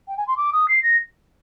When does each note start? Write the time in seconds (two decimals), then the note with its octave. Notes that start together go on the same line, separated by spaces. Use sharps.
0.08 G5
0.17 G#5
0.28 C6
0.37 D6
0.53 D#6
0.68 C7
0.83 A#6